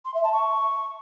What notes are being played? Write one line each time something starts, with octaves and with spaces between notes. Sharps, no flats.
C6
E5
A5
C#6